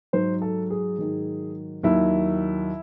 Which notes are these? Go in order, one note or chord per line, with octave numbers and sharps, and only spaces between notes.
G#2 F#3 C5
A4
G#4
G#2 D#3 F#3
D#2 D#3 F#3 E4